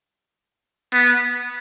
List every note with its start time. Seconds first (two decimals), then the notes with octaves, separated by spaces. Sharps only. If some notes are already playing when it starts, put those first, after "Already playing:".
0.93 B3